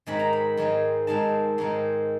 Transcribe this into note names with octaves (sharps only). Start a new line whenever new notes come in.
G#2 D#3 G#3 C4 B5
A#5
B5
G#2 D#3 G#3 C4
G#2 D#3 G#3 C4 A5
G#2 D#3 G#3 C4